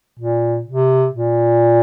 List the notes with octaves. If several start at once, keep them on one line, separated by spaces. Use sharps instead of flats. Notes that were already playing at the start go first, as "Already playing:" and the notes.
A#2
C3
A#2